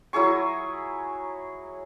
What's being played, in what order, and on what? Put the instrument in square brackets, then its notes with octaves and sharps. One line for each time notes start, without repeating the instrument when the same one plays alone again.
[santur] F#3 E4 G#4 C#6